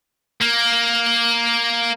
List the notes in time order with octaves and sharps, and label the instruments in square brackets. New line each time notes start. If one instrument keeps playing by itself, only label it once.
[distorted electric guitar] A#3